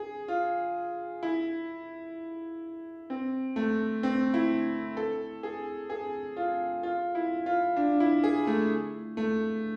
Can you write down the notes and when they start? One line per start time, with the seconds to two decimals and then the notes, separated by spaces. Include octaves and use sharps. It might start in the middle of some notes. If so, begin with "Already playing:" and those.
Already playing: G#4
0.28 F4
1.23 E4
3.10 C4
3.56 A3
4.03 C4
4.34 E4
4.97 A4
5.43 G#4
5.90 G#4
6.37 F4
6.83 F4
7.15 E4
7.46 F4
7.76 D4
8.00 E4
8.23 G#4
8.47 A3
9.17 A3